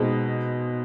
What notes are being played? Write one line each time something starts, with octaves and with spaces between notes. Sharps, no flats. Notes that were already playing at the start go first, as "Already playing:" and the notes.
Already playing: B2 G#3 C4 D#4